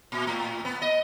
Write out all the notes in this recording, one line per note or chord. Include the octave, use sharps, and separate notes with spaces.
A#2
A2
B3
D#5